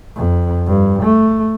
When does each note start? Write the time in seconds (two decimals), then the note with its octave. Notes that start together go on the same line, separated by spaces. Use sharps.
0.16 F2
0.67 G2
1.02 A3